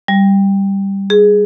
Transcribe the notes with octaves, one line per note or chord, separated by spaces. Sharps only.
G3
G#4